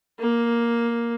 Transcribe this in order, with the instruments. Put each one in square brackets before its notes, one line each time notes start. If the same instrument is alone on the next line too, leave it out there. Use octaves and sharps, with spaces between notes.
[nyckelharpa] A#3